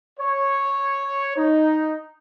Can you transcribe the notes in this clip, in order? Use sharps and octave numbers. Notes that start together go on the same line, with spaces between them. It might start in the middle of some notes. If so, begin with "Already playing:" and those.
C#5
D#4